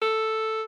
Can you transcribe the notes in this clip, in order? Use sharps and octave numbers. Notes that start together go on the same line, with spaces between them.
A4